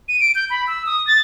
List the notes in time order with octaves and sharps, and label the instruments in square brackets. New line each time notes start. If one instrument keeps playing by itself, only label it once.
[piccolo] D#7
D7
G6
B5
E6
D#6
A6